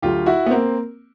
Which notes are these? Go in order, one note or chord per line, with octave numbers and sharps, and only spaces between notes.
D2 D3 F#3 F4 G4
E4 F#4
B3
A#3 C4